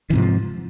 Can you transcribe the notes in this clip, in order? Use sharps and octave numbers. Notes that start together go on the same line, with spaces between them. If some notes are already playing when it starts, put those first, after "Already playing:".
G#2 C3 E3 F3